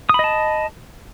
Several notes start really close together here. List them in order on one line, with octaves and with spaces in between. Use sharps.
D#6 B5 D#5 A5